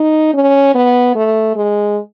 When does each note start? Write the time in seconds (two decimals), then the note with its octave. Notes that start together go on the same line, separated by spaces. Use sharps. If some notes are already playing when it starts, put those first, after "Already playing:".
Already playing: D#4
0.34 C#4
0.75 B3
1.15 A3
1.56 G#3